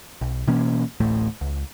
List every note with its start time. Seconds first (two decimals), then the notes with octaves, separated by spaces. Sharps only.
0.21 B1
0.47 B2 E3 A#3 C#4
1.00 D1 A1 A2 A3
1.41 C#2